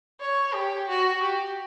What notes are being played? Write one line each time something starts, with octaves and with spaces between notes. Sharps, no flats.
C#5
G4
F#4
G4